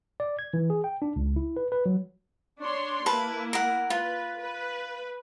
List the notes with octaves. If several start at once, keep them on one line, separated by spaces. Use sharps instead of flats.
D5
G#6
E3
G#4
G5
D4
C#2
E4
B4
B4
F#3
D4 C#5 C6
A#3 E4 B4 A5
A#4 F#5
F4 B4
B4